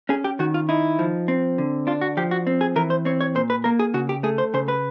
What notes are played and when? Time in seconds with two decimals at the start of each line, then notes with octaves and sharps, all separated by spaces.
0.09 C#4 G#4
0.24 G4
0.39 D#3 F#4
0.54 F4
0.69 D#4 E4
0.99 F3
1.28 C4
1.58 D3
1.87 D4 F4
2.01 F#4
2.17 F3 G4
2.31 F#4
2.47 C4
2.61 G#4
2.76 E3 A#4
2.90 C5
3.05 C4 C#5
3.21 C#5
3.35 A#2 C5
3.50 B4
3.64 A#3 A#4
3.79 G#4
3.94 C#3 F#4
4.09 G4
4.23 A3 G#4
4.38 C5
4.54 C#3 C5
4.68 B4